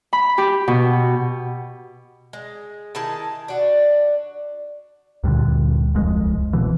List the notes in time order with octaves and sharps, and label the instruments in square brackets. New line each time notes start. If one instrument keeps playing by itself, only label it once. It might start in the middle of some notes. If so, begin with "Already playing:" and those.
[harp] B5
G4
B2
[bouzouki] G#3
D#3 E4 G#4 A5
D4 F#4
[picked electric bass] D2 G2 A#2 D3
D1 C2 F2 G#3
D1 C2 B2 E3